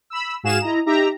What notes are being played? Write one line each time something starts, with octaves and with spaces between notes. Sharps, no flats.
B5 E6
G#2 F#4 G#4 F5 E7
E4 D#5 A#5
D#4 G4 E5 A#5